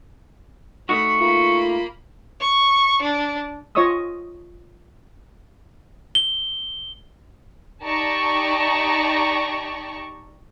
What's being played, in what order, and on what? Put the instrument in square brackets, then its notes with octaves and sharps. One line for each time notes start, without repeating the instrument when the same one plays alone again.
[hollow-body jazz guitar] A3 D#4 F#4 [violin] B5 [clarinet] C#6
[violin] A#3 B5 [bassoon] F4
[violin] C#6
D4
[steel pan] F4 C#5 D#5 C#6 D#6 E6
[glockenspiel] G7
[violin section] D#4 G4 D5 A5 A#5 C#6